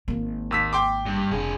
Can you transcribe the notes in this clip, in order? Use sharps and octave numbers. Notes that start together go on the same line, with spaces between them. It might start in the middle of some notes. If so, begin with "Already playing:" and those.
G#1 A#3
D#2 E6 B6
G5 C6 D6
G2
F1 D4 G#4